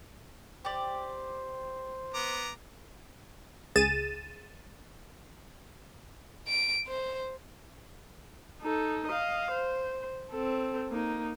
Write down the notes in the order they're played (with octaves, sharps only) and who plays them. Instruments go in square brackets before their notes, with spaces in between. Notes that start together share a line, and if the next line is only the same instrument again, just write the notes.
[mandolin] G4 D5 [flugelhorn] C5
[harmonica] B3 A#5 D6
[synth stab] C#2 G#4 A6 D#7 E7
[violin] D7
C5
[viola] D#4 A4
D#5 F5
C5
C4 A4
A#3 D#4